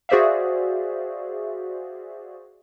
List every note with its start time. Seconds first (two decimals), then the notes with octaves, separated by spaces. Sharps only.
0.09 F#4 G#4 C5 D5 E5 F5